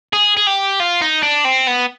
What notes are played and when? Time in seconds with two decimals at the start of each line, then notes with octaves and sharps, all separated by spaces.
0.13 G#4
0.37 G#4
0.47 G4
0.80 F4
1.02 D#4
1.23 D4
1.45 C4
1.68 B3